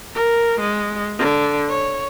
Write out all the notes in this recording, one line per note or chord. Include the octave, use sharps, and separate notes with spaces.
A#4
G#3
D3
C#5